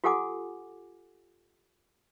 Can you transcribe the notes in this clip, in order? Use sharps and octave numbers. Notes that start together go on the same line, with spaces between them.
F4 G4 A4 F#5 G#5 D6